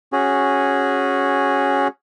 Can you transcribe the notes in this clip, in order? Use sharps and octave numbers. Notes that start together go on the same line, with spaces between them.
C#4 F#4 G#4